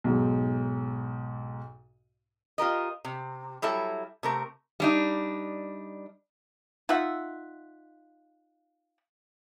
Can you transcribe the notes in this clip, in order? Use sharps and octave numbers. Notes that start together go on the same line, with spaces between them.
B1 G#2
F4 G4 A#4 D#5
C3
F#3 G3 E4 A4 E5
C3 A3 A#4
G3 D4 D#4
D#4 F4 E5 F#5